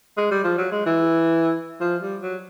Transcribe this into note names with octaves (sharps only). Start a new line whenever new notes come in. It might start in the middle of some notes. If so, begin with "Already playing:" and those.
G#3
G3
F3
F#3
G#3
E3
F3
G3
F#3